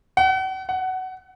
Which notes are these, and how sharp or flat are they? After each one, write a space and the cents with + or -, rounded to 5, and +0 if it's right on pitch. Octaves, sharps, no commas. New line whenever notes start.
F#5 +40
F#5 +15